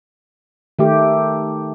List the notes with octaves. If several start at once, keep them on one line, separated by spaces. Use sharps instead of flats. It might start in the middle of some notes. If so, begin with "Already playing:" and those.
D#3 A3 G4